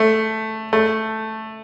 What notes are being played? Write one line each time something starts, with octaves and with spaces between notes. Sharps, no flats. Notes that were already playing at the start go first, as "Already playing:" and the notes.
Already playing: A3
A3